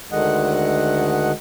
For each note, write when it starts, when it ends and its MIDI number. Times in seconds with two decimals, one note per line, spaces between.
0.12 1.31 38
0.12 1.31 50
0.12 1.31 51
0.12 1.31 56
0.12 1.31 75
0.12 1.31 78